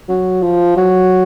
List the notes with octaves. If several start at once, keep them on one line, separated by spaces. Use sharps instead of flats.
F#3
F3
F#3